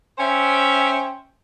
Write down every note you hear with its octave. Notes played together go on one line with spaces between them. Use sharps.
C#4 C5 E5 G5